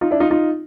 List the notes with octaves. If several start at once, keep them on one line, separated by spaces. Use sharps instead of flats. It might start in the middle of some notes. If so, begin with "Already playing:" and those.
D#4 F4
D4 E4
D#4 F4
D#4 F4